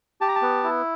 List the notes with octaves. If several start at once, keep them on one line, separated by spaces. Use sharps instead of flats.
G4 A5
A#5
A5
B3
E4